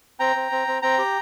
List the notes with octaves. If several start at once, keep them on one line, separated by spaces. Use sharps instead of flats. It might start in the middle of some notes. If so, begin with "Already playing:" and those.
C4 G5 A#5
C4
C4
C4
C4 G5 A#5
G4